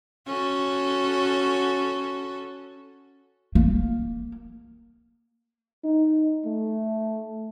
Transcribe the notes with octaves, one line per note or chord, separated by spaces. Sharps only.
C#4 F#4 A4
A#3
D#4
A3